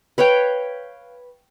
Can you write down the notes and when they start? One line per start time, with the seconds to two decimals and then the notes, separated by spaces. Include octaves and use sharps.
0.18 B4 C#5 F5 G5